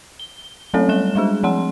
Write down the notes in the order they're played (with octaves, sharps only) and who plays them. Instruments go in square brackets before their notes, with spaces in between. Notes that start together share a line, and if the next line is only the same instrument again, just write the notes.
[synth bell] G7
F#3 A3 C4 C#4 A4 C#5
G3 F#6 E7 G7
G3 G#3 D4 G#4
F3 C4 F#5 C6